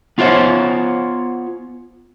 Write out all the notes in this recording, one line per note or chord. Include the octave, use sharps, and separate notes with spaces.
B3 F4 G#4 A#4 C5 C#5